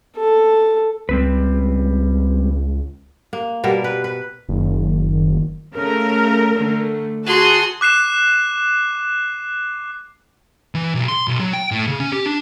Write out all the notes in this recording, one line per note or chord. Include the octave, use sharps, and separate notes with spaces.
A4
C#2 G3 C4 B4
A#3
B2 G3 A#4
B4
B4
F#1 D#3
C#3 A3 A#4
D3 A3
F#4 G#4 A5 C6
D6 F#6 C7 E7
E3
B1
C6
B1
F#3
G5
A2
C#3
C#4
G4
D4